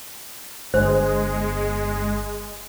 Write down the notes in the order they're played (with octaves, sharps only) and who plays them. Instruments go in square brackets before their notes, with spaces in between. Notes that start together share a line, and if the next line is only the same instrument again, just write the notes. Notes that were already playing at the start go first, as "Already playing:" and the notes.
[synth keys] G1 [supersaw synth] G#3 [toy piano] C5